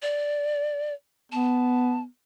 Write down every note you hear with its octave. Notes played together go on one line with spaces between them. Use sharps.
D5
B3 A5